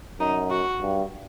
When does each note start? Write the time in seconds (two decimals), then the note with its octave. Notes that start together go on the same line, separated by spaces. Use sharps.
0.19 F#2 D#4
0.50 F#4
0.81 G2